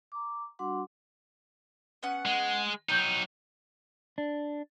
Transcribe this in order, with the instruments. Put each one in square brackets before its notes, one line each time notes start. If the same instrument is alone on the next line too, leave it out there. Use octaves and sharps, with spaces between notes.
[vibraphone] A#5 D6
G3 D4 F#4 F#5 C6 D6
[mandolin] B3 C#4 F#5
[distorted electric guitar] G#3
[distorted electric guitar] F#3 D#4 [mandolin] G5
[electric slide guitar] D4